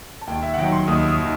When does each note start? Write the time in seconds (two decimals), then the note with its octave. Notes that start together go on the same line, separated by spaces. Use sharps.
0.21 A5
0.27 D#2 G5
0.42 E5
0.54 F#5
0.57 D#3 F#3 G5
0.72 C6
0.87 D#2 D#6
1.08 D#6
1.18 D#3